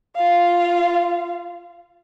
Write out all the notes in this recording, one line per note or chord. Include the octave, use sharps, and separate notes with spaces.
F4 F5